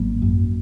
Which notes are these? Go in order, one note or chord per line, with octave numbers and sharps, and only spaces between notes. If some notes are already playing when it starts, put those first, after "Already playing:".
Already playing: G#1 F#3 A#3
F#2